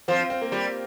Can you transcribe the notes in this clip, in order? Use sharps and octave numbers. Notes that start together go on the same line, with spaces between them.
F3 C4
F4
C4
A#3
G3 F4